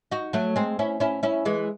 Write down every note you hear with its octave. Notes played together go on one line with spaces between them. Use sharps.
D#4 F#4
F#3 A3
G#3 C4
C#4 E4
C#4 E4
C#4 E4
E3 G#3